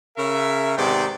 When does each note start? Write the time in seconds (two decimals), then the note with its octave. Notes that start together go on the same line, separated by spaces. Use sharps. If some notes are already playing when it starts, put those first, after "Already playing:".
0.18 C#3 A#4 E5
0.77 G#2 C3 D#3 B3 D5 G5